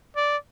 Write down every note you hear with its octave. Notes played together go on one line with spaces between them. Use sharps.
D5